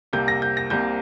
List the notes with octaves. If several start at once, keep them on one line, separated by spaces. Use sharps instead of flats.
C2 C3 A#3 G6
A#6
G6
A#6
C2 C3 A#3 G6